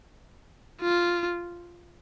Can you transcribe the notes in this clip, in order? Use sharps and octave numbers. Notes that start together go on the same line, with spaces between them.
F4